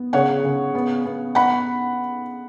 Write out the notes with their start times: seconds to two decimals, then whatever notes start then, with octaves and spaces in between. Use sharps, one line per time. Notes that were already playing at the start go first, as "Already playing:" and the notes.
Already playing: B3
0.13 C#3 C#5 F#5
0.44 C#3
0.75 B3
1.05 B3
1.35 B3 F#5 B5